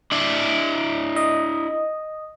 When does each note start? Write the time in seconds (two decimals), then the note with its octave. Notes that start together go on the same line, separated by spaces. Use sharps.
0.12 D4 E4 D5
1.16 D#5